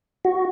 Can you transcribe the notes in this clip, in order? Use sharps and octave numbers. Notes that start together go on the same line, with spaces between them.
F#4